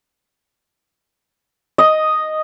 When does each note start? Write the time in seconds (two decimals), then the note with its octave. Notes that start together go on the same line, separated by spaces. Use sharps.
1.78 D#5